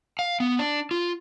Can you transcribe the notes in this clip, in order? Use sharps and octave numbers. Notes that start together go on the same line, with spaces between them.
F5
B3
D4
F4